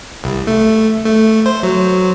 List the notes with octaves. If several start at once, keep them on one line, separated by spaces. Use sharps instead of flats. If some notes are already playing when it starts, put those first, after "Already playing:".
C2
A3
A3
C5
F#3